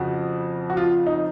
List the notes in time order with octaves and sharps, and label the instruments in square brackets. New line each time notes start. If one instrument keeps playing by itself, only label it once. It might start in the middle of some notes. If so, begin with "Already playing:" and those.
Already playing: [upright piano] F2 C#3 F3 F#4
F#4
F4
D#4